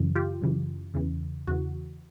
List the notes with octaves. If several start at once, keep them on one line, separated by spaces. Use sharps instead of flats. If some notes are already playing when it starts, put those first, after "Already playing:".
Already playing: F#2 C#3 E3
F4 G4
F#2 C#3 E3
E2 C#3 E3
E2 C#3 E3 F#4